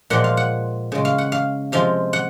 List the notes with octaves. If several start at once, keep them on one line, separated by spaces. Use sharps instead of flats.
A#2 F3 G#3 F#5
F5
F#5
C#3 G#3
F5
F#5
F5
C3 F3 G#3 F5
F#5